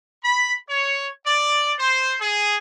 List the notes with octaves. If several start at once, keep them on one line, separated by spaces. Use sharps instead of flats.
B5
C#5
D5
C5
G#4